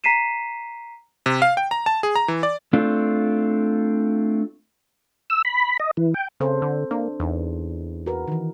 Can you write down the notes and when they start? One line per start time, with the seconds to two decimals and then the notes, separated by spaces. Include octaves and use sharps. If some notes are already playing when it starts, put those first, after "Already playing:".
0.04 A#5 B6 C7 D#7 E7
1.26 C3
1.42 F5
1.57 G5
1.71 A#5
1.86 A5
2.03 G#4
2.16 A#5
2.28 E3
2.43 D5
2.73 A3 C4 D4 F4
5.30 E6
5.45 B5
5.80 D#5
5.97 E3
6.14 G5
6.40 C#3 C4 A4 C5
6.62 D3
6.91 A#3 D4
7.20 E2 D4 D#4
8.06 F#4 A#4 B4
8.28 D#3 E3